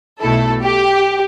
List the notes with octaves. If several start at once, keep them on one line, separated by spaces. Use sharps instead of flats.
B1 B2 A3 E4 A4
G4